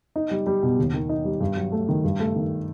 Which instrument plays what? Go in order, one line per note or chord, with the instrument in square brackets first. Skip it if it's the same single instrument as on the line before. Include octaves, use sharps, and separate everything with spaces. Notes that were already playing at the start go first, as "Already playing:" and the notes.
[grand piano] D#4
G3
G3
B2
D#2
D#3
D#4
G3
G2
F#3
A3
D#3
G2
A3
D#3